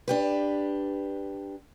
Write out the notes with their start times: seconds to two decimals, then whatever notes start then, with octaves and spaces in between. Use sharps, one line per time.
0.08 D4 G4 B4